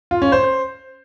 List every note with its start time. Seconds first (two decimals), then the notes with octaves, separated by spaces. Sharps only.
0.11 F4
0.22 C#4
0.32 C5